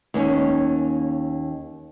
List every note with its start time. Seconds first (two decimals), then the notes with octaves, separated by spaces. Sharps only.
0.14 D#2 A#3 C#4